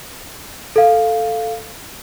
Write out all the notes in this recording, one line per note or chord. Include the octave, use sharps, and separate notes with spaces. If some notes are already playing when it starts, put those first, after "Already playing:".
A4 F5